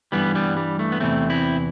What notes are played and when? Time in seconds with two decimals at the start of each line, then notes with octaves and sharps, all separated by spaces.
0.12 G2 E3 G3 B3
0.35 G3 B3
0.57 G3
0.79 A3
0.92 B3
1.00 E2 C3 E3 A3 C4
1.30 C4 E4